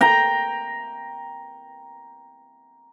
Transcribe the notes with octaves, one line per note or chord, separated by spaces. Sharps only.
G5 A#5